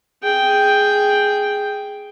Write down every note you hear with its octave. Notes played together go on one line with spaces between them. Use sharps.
G#4 G5